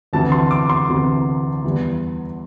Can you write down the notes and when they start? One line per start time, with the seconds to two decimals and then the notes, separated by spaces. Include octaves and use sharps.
0.13 D2 C3 E3 A5
0.32 C6
0.51 D6
0.69 C6
0.89 D2 C3 E3
1.64 E2 E3 G3